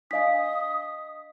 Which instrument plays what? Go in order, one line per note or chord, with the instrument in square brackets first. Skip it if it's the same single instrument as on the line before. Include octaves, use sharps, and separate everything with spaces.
[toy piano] D4 F5 G#5 [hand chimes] D#5 B6 [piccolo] D#6